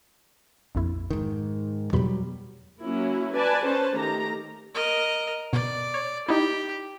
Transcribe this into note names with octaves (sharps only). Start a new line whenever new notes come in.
A#1 F2 E4
G#2 D#3
E2 B2 F#3 G3 B5
F#3 A#3 C#4 E4
B4 D5 G#5 A5
C#4 B4 C5 A5
D#3 A3 G4 A#5
A#4 D#5
B2 D5
C#5
D#4 E4 G4